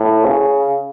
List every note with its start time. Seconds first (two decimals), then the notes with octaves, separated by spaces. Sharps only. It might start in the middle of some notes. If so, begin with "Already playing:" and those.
Already playing: A2
0.25 C#3